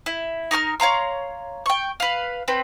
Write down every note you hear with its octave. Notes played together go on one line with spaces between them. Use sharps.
E4
D#4 A#4 C#6 F6
C#5 F5 A#5 C6
G5 C#6
B4 F5
C4 B4 G5